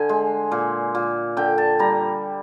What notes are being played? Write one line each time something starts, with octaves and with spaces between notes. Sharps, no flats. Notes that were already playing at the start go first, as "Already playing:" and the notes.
Already playing: D3 G#5
G#3
A#2
A#2
D3 G5
A5
G3 A#5